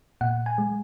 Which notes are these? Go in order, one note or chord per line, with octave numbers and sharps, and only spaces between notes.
A#2 F#5
G#5
G#3